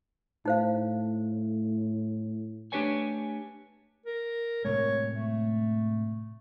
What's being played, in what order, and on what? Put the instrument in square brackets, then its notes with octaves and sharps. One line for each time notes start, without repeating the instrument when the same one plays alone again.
[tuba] A2 [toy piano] D#4 C5 F5
[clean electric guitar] A3 D4 G4 B4 C#5 G#5
[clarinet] A#4
[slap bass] A2 C3 G#3 [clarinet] C#5
[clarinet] A3